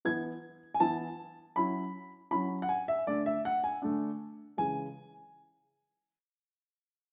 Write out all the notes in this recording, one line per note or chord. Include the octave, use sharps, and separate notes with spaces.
E3 B3 E4 G#6
G#5
E3 B3 E4 A5
F#3 C#4 E4 B5
F#3 C#4 E4 B5
F#5
G#5
E5
D3 A3 D4 D5
E5
F#5
G#5
D3 A3 D4
C#3 E3 G#3 G#5